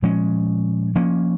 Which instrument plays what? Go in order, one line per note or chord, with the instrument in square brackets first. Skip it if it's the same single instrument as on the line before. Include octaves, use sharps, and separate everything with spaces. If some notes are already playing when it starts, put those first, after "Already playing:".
[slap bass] A#2 F3 G#3 C#4
F3 A#3 C#4